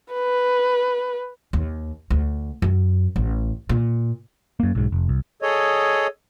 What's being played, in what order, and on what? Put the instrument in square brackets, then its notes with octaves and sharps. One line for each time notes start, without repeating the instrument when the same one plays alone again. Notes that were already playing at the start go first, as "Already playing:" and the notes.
[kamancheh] B4
[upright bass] D#2
D2
F#2
A1
A#2
[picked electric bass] F#2 A#3
B1 G#2
F1
C2
[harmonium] G#4 A4 C#5 D#5